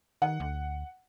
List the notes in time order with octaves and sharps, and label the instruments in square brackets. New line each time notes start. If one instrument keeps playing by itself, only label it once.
[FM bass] D#3 [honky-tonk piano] F#5
[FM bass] D2